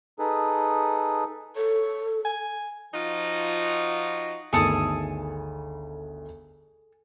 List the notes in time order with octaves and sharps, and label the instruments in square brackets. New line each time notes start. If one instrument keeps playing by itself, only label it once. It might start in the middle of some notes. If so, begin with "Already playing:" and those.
[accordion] D#4 G#4 A4 B4
[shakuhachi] A4 [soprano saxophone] C#5
[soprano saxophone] G#5
[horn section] F3 D#4 F4 F#4
[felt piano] G1 D2 D#3 [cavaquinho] G#4 A4 D#6